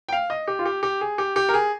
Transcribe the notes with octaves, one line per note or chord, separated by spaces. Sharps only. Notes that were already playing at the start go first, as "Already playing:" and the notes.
G5
F5
D#5
G4
F4
G4
G4
G#4
G4
G4
A#4
G#4